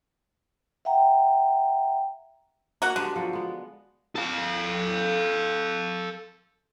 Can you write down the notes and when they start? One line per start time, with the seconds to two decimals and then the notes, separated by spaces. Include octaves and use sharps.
0.85 E5 F#5 G5 A#5
2.82 A#3 F#4 F#5
2.96 D3 G#3 B3 G4
3.16 F3 F#3 A4
3.33 G#3 B3
4.16 A4 F5